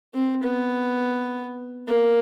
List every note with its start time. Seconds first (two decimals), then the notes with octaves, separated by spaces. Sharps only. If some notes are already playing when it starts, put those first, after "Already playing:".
0.14 C4
0.43 B3
1.88 A#3